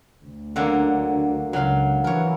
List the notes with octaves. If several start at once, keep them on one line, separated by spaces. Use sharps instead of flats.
D2
D3 F#3 A#3
C#2 F#3 F5
E3 A#4 C#5